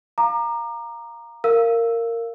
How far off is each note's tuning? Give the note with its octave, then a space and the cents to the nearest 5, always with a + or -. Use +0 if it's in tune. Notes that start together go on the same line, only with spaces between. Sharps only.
F5 +0 A#5 +0 D6 +35
A#4 -15 F5 -15 E6 +0